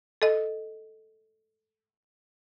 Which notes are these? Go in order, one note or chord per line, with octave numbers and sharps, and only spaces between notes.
A4 D#5